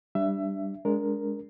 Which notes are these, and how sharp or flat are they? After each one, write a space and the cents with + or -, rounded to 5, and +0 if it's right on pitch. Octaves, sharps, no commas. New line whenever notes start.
G3 +0 D4 +0 E5 +20
G#3 +0 D4 -30 A#4 +0